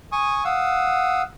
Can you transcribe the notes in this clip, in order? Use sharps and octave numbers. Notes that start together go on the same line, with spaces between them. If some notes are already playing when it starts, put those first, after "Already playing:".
G#5 C#6 D#6
F5 F#5 D#6 E6